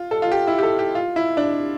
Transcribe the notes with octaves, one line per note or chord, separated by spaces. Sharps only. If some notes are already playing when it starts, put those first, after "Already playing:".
Already playing: F4
A4
F4
G4
E4
G4
A4
G4
F4
E4
D4